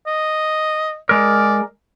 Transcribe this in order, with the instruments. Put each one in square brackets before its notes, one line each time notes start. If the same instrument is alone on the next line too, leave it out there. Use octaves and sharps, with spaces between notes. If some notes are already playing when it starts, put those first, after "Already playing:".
[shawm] D#5
[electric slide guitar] G#3 A#4 [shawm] D5